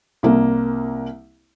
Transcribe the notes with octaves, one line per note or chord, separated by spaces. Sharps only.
C2 A#3